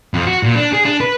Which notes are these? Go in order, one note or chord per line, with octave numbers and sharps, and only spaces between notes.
F2
F#4
A#2
D4
G#4
D4
B4